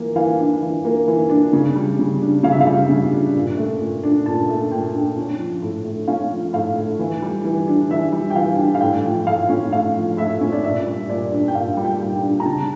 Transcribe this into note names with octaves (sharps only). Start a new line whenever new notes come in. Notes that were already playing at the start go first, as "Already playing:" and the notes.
Already playing: E3 A#3
E3 F5
D4
E3
A#3
E3
D4
C#3
G3
C#3
D4
C#3 F5
E5
F5
G3
C#3
D4
A#2
A3
A#2
D4
A#2 A5
A3
A#2 G5
D4
C#4
F3
A2
A3
C#4 F5
F3
A2 F5
A3
E3
G3
E3
D4
E3 E5
G3
G5
E3 F5
D4
F5
A2 G5
F3
A2 F5
C#4
A2 F5
F3
A2 E5
C#4
D5
A#2 E5
G3
A#2 D5
D4
G5
A#2 F5
G3
G5
A#2
G5
D4
A#5
C#3 A5